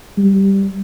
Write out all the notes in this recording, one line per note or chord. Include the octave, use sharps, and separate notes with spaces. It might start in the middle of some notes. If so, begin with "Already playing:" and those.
G3